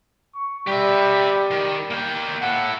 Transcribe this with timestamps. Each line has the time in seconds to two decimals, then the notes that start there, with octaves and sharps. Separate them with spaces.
0.35 C#6
0.68 G3 G4 E5
1.51 D#3
1.91 A#3 G5
2.42 E4 A4 F#5